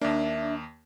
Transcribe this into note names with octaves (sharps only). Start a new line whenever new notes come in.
D#2 A#3 D4 E5